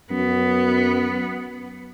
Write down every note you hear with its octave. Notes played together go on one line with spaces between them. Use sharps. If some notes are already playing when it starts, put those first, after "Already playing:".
F#2 B3